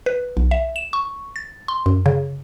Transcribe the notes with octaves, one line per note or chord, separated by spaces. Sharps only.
B4
B1
E5
E7
C#6
A6
C6
F#2
C#3